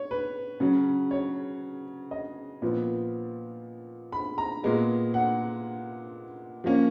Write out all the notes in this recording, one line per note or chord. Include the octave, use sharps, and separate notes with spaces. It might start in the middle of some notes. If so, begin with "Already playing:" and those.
Already playing: C#5
B4
C#3 F#3 C#4
C#5
D#5
A#2 F3 B3
B5
A#5
A#2 G#3 B3
F#5
F3 A#3 C#4